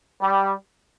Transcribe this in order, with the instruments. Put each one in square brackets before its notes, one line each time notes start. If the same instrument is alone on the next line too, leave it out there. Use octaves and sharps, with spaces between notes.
[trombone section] G3